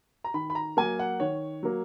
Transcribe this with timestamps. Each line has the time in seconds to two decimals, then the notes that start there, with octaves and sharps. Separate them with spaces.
0.24 A#5
0.34 D#3 B5
0.50 B5
0.55 A#5
0.77 F#3 A#3 G#5
0.99 F#5
1.20 D#3 C#5
1.63 F#3 A#3